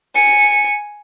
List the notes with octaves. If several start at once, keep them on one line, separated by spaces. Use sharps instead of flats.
G#5 C#7